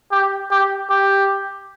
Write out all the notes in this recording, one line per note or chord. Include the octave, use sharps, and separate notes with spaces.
G4
G4
G4